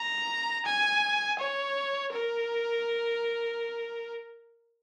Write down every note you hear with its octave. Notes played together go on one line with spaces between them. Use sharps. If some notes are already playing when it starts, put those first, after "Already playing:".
Already playing: A#5
G#5
C#5
A#4